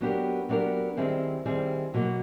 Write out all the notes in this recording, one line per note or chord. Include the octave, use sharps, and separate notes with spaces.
F#3 B3 D4 G4 A#4
F#3 B3 D4 G4 A#4
D#3 G3 C4 E4 G#4
D#3 G3 C4 E4 G#4
B2 F#3 A#3